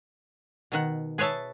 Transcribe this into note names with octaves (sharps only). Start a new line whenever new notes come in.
B2 D#3 F#5
G#4 B4 C#5 E5 A5